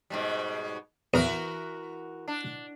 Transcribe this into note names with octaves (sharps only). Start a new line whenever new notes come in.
G#2 B2 G3
E2 E3 F#4 A#4
D4